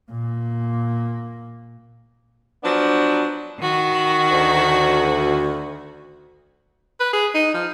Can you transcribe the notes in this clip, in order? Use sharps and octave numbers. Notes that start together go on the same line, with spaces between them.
A#2 A#3
F3 F#3 B3 D4
D#3 F#4
D2
B4
G#4
D#4
F3